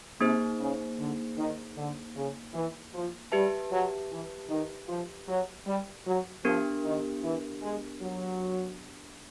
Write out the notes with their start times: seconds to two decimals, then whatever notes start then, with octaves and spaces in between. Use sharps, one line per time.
0.20 C3 A#3 D#4 G#4 C5
0.59 C#3
0.98 D3
1.37 D#3
1.77 D3
2.15 C#3
2.54 E3
2.94 F3
3.32 G3 G4 B4 E5 A5
3.71 F#3
4.11 E3
4.49 D#3
4.88 F3
5.28 F#3
5.66 G3
6.06 F#3
6.44 F3 B3 D4 G4 A#4
6.84 D#3
7.22 E3
7.62 G#3
8.01 F#3